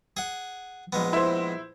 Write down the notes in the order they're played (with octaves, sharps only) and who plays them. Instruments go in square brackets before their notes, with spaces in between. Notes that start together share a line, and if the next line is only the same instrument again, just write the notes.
[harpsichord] G#4 F#5
A#1 G#3 B3
[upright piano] E4 C5